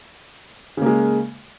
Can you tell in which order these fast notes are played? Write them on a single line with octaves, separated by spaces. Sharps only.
C#3 A#3 G#3